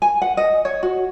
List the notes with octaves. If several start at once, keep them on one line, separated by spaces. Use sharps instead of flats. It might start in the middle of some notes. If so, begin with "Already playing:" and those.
G#5
F#5
D#5
C#5
F#4